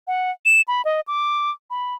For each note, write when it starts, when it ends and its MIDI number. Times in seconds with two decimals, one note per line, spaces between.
0.07 0.31 78
0.45 0.61 100
0.68 0.82 83
0.85 1.01 75
1.08 1.51 86
1.70 1.95 83